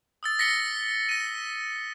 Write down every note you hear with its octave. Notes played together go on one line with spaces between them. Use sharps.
D#6 E6 A6
A#6 B6 C#7 G7
A#6 D#7